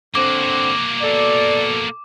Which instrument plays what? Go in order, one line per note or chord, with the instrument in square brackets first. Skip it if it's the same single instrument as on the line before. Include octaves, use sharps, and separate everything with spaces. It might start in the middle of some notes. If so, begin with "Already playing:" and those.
[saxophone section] D3 C4 [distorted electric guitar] A#3 F#4 [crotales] D6
[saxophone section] B2 A4 [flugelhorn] D5